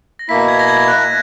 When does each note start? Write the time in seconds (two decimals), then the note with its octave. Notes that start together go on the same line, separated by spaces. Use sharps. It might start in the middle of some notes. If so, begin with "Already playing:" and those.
0.19 A#6
0.29 B2 A#3 E4 B6
0.48 G#6
0.59 A#6
0.68 G#6
0.88 F#6